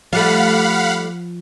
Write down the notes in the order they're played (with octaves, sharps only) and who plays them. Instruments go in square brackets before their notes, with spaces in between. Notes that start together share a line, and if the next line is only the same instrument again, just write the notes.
[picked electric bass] F3 [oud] G3 A3 [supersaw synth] F5 F#5 B5